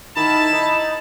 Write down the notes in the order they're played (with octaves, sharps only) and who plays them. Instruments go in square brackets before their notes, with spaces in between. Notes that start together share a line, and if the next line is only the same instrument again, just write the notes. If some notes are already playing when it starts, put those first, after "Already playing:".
[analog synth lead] D#3 [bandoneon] E4 B5 [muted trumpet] A5
[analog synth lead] D#4